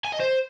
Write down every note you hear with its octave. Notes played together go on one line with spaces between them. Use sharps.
G#5
D#5
C5